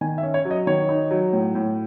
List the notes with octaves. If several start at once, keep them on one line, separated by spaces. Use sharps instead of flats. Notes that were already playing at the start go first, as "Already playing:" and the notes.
D#3 G#5
E5
C#4
C#5
F#3
D#5
D#3 C#5
D#4
F#3
A2
A2